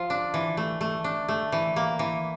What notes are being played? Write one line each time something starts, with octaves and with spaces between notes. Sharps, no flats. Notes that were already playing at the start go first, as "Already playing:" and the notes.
Already playing: F3 F4
D4
E3
A3
A3
D4
A3
E3
A#3
E3